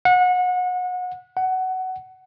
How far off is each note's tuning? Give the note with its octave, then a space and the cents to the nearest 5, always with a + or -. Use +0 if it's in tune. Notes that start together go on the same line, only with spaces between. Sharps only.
F#5 -30
F#5 +15